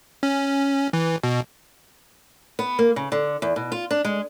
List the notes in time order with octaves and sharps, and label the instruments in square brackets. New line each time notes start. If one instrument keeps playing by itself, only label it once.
[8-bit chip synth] C#4
E3
B2
[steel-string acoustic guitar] B3
A#3
C#3
D3
E2
B2
F4
D4
G#3